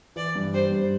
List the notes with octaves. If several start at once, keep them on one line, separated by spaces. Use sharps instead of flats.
E3 D5
G2
G3 C5
G2